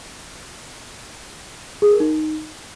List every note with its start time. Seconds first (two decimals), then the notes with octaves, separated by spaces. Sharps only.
1.82 G#4
1.91 A#4
2.00 D#4